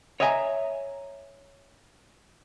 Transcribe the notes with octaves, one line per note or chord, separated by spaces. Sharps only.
C#5 D#5 E5 G#5 A#5